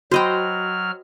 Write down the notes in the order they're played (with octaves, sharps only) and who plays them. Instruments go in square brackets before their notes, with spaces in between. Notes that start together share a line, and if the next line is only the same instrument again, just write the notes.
[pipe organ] F#3 F6 [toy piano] F#4 B5 [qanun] C5 D#5 G5